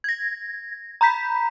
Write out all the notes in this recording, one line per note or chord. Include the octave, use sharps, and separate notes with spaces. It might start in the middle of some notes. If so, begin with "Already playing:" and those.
G#6 A#6
A#5 B5 G6 B6